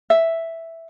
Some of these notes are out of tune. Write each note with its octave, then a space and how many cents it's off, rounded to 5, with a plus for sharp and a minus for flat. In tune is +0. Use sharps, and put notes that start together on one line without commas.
E5 +0